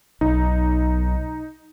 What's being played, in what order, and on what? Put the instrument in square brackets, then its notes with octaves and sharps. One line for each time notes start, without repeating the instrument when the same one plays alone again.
[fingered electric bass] B1 [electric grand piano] D#4